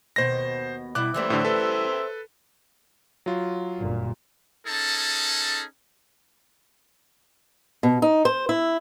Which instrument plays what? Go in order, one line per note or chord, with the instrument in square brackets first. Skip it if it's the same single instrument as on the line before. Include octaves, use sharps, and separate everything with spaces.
[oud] D#2 B2 [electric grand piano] C5 A#6
[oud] B2 G3 E4 [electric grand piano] D6 F#6
[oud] E3 G3 A3 [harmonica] C5 E5
[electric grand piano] A2 D3
A4 B4
F#3 F4
[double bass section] G1 F#2 A#2
[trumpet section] C#4 D#4 G#4 A4 A5
[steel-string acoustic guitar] B2
D#4
C5
E4